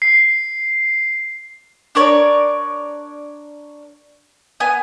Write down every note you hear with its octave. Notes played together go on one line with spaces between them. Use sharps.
C7
D4 A#4 C#5 D5
B3 G#5